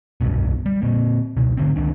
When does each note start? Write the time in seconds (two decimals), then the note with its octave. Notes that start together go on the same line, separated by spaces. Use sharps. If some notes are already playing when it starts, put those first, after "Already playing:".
0.21 F1 C2 G2 B2
0.66 G3
0.82 A#2 A#3 C4
1.37 C#2 B2
1.57 G#2 D3 C4
1.76 C#2 D#3 C4 D4